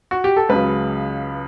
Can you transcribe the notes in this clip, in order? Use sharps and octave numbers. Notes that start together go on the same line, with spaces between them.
F#4
G4
A4
C#2 C#3 F#3 B4